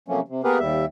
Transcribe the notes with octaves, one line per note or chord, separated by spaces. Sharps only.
C3 F3 F#3 A3 A#3 C#4
C3
A#3 B3 G4 G#4 A#4 B4
D#2 G3 E5